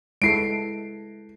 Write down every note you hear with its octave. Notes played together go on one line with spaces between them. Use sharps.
G#3 E4 A4 C7 D7